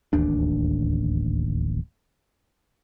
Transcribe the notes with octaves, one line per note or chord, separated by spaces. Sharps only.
D1 A1 D#2 D4